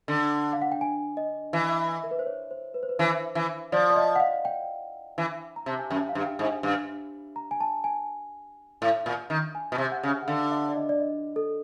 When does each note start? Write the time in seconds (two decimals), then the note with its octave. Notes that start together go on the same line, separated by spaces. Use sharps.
0.08 D3
0.53 F5
0.62 F#5
0.72 G5
0.81 G#5
1.17 D#5
1.53 E3
2.04 A#4
2.11 B4
2.19 C5
2.26 C#5
2.51 C5
2.74 B4
2.83 C5
2.89 B4
2.99 E3 C5
3.35 E3
3.72 F3 D5
3.90 D5
3.96 D#5
4.16 F#5
4.20 F5
4.45 G5
5.18 E3
5.56 A#5
5.66 C3 A5
5.79 G#5
5.90 F#2 G5
6.09 F5
6.15 G2
6.26 G5
6.39 G#2
6.45 G#5
6.63 G2
7.36 A#5
7.51 G#5
7.61 A5
7.84 G#5
8.82 A2
9.06 A#2
9.30 D#3
9.55 G#5
9.72 B2
9.78 C3
9.92 F#5
10.03 C#3
10.22 F#5
10.27 D3 F5
10.51 E5
10.69 D5
10.76 D#5
10.89 D5
11.00 D#5
11.36 A4